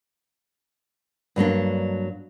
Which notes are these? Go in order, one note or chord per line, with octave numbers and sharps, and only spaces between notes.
G2 F#3 A#3 D4